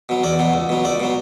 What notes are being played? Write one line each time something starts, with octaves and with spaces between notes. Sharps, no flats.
B2 F#3
E2 D5
B2 F#3
C#2
B2 F#3
C#2 D5
B2 F#3